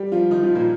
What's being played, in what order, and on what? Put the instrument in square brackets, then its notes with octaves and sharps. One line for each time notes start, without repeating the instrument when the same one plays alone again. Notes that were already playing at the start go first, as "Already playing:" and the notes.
Already playing: [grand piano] G3 G4
F3 F4
D#3 D#4
F3 F4
A#2 A#3